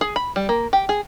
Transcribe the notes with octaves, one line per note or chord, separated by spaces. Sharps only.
G#4
B5
G3
A#3
G4
G#4